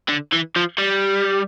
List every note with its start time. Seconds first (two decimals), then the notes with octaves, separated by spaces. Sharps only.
0.09 D3
0.32 E3
0.56 F3
0.79 G3